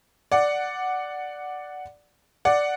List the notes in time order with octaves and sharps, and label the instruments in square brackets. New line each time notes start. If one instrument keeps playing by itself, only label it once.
[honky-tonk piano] D5 F#5
D5 F#5